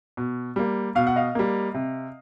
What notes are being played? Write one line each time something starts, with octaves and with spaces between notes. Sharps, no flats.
B2
G3 A#3
B2 F5
F#5
D#5 F5
G3 A#3
C3